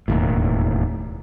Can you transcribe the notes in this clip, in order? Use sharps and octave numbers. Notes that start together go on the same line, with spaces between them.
E1 D#2 A2